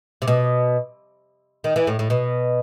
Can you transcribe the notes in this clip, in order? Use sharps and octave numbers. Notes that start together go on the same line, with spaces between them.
C3
B2
D#3
E3
A2
A2
B2